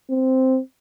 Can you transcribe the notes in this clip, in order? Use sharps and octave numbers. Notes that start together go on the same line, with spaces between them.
C4